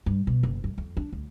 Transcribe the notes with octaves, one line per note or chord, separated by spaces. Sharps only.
G2
B2
F#1
F#2
F2
D4
D2